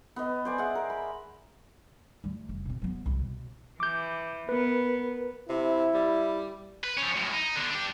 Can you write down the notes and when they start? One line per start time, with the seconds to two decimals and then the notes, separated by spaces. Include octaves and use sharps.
0.16 B3 B4 D#5
0.45 C5 D5 G#5
0.58 G#4 E5 F#5
0.75 A#4
0.90 B5
2.24 G3 A3
2.49 F1
2.65 B2 C4
2.82 F#3 B3
3.06 C2 A2
3.19 B2
3.80 E3 D6 G6
4.49 B3 A#4 B4
5.49 C3 E4
5.94 G3
6.84 B4
6.98 F3 C#4
7.17 F#2 A2
7.34 D#4
7.56 D3 B3
7.71 D4 G4